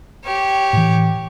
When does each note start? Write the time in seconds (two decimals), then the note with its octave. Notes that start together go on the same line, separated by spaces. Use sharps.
0.24 G4 C#5
0.73 A2 E3